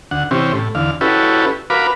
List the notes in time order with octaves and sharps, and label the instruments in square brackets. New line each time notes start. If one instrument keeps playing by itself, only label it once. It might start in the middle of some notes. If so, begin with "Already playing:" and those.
[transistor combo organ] D2 F#5
C3 E3 C4 C#4 G4
A2
E2 D3 F5
C#4 E4 F#4 G4 A4 B4
F#4 A#4 B4 F5 B5 D6